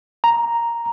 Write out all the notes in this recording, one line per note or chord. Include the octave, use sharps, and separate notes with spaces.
A#5